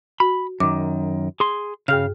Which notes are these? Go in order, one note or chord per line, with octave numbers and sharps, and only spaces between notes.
F#4 B5
F#2 D#3 D6
G#4 C6
G2 C#3 G#4 F5 F6